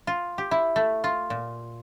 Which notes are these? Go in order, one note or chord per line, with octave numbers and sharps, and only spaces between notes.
F4
G4
E4
A3
F4
A#2